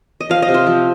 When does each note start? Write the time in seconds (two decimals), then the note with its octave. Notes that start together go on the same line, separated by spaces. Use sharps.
0.21 D#5
0.29 F3 F5
0.42 D#5
0.48 C3
0.54 C5
0.67 F3